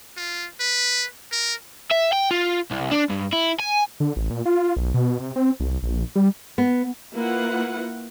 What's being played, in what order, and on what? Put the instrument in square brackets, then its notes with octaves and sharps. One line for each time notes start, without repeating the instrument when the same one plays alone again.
[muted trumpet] F4
B4
A#4
[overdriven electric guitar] E5
G5
F4
C2
D4
G2
E4
G#5
[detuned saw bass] D3
A1
A#2
F4
B1
B2
C3
C4
C2
A#1
G3
[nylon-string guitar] B3
[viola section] A#3 E4 F4 B4 F#5